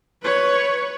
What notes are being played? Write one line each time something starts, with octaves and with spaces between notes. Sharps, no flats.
B4 C#5